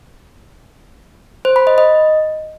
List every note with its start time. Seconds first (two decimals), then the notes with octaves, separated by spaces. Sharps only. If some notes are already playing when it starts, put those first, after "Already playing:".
1.45 C5
1.56 B5
1.67 D#5
1.78 D#5